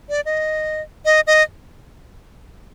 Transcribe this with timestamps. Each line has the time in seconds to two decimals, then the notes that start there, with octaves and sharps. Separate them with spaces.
0.10 D5
0.25 D#5
1.05 D#5
1.27 D#5